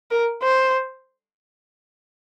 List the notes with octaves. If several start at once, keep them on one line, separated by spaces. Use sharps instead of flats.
A#4
C5